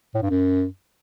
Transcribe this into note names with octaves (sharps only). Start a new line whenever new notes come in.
A2
G2
F#2